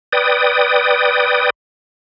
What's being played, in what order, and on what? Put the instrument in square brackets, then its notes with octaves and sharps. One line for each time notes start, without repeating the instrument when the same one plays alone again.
[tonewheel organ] B4 D5 G5 D#6